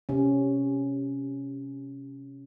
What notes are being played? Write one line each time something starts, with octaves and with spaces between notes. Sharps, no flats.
C3 C#4